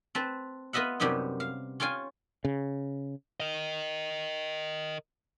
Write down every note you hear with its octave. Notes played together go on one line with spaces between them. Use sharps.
C4 B4 A5
B3 F4 D#5 E5 F#5
F#2 C3 G3 B3 D#4
F5
C#4 F4 F5 G5 G#5
C#3
A#4 D#5